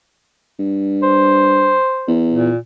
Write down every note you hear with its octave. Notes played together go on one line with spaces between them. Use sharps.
G2
C5
E2
A#2